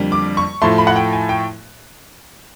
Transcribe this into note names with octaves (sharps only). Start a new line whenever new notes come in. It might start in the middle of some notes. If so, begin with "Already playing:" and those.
Already playing: F2 D3 G3 A#3
D6
C#6
A2 F3 A3 C6
B5
F#5
G5
G#5
G5